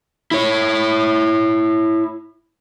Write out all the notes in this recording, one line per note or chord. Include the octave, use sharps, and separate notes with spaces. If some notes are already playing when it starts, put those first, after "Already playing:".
E4 C#5